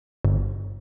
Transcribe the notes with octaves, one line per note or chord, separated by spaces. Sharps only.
G1